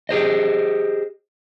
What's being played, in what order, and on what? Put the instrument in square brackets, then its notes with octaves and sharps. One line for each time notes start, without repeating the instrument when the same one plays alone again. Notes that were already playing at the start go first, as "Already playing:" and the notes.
[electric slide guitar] G4 G#4 C5 D#5